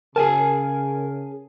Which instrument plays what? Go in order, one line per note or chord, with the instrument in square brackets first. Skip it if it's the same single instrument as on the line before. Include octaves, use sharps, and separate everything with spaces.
[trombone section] C#3 [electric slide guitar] G#4 G#5 A5 [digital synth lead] A#4